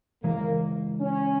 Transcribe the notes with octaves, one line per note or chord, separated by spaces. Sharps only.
C#3 E3 G#3 A#3
C#4